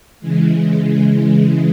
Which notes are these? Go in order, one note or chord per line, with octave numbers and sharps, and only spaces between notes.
C#3 E3 G#3